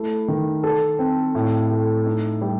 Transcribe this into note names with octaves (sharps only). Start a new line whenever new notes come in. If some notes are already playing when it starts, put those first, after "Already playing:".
Already playing: A3 E4
D#3
A4
C4
A2
A3
D#4
G3